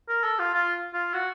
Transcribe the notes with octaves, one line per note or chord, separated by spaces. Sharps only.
A#4
A4
F4
F4
F4
F#4